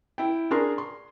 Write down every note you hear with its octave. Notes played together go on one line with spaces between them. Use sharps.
E4 G5
D4 G#4 A#4 C6
C6